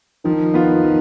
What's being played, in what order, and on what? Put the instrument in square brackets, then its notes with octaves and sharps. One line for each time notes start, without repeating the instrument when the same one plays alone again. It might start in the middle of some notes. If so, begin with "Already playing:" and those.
[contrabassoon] D#3 [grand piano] F3
[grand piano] B3 F4
F3